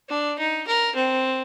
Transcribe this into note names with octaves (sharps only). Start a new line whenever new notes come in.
D4
D#4
A#4
C4